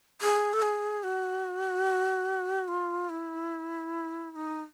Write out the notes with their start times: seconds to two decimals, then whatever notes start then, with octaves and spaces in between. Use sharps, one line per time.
0.21 G#4
0.53 A4
0.62 G#4
1.03 F#4
2.68 F4
3.09 E4
4.32 E4
4.36 D#4